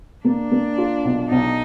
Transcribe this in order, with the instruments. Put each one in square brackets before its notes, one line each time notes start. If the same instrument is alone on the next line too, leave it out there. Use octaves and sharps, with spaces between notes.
[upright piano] A#3 [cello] D4
[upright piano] A#3
F4
B1
[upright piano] B1 [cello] D#4